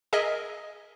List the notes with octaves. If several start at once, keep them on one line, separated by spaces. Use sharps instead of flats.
G#4 A#4 D#5 E5 G#5